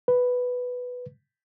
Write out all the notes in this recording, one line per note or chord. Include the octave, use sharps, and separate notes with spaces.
B4